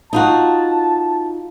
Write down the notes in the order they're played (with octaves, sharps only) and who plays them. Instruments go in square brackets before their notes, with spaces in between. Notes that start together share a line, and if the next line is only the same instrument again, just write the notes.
[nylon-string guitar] D#4 F4 F#4 [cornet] A5